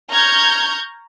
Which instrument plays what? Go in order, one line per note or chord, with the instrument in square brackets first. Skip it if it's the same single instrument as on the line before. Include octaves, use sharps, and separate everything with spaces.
[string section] A#5 C#6 F6 G6 G#6